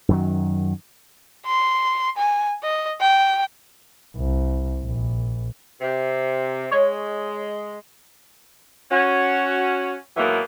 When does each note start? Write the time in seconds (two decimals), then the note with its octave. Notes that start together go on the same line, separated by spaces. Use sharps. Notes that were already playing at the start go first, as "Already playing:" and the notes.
0.09 F#2 D#3 F#3
1.46 C6
2.17 G#5
2.64 D#5
3.01 G5
4.17 C2
4.83 A#1
5.81 C3
6.71 G#3 C#5
8.92 C#4 F#4
10.17 G#2 B2 D#3 E3 F#3 A#3